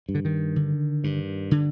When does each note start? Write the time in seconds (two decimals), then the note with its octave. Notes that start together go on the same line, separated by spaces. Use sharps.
0.09 G2
0.15 D3
0.25 D#3
0.56 D3
1.04 G2
1.51 D3